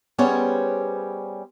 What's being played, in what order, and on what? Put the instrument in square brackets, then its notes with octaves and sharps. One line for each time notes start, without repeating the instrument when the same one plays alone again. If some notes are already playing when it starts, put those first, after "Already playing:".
[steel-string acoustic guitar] G3 B3 C#4 G#4 C5 C#5